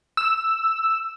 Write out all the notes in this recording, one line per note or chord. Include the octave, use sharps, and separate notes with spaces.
E6